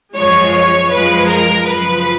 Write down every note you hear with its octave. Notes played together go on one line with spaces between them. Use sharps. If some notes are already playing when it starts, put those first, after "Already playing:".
F#2 F3 G#3 C#5
C#5
F#2 F3 G#3 B4
A#4
F#2 C#3 F3 B4